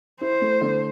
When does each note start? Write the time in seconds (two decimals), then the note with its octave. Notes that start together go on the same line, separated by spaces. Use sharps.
0.21 E4 C5
0.42 A3
0.61 D3